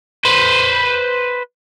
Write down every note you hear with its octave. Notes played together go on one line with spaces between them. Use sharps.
B4 C5